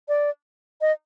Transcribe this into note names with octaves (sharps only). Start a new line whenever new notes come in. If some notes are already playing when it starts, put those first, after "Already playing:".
D5
D#5